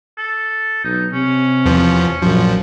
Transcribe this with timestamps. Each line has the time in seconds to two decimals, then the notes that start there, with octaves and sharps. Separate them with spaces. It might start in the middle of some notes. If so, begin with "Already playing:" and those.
0.17 A4
0.84 B1 D#4
1.13 C3 C#4
1.65 E2 F3
2.22 A#1 F#2 F3